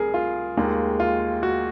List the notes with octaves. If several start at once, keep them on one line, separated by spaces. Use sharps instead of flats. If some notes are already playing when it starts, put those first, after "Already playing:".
Already playing: C2 C3 G#4 A#4
F4
D#2 D#3 G#3
F4
F#4